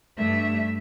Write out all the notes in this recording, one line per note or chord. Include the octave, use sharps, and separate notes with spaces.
G2 A3 E5